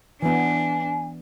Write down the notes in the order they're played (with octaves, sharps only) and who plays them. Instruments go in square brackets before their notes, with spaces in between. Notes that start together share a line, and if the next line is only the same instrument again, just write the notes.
[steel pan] E3 B3 [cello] D4 [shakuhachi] G#5